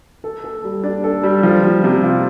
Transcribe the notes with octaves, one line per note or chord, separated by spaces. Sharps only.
A4
A4
G3
D4
A4
G3
F3
F3
C3
F4